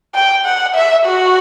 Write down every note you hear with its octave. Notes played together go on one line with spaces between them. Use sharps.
G5
F#5
E5
F#4